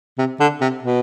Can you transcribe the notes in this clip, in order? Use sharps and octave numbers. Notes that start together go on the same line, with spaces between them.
C3
D3
C3
B2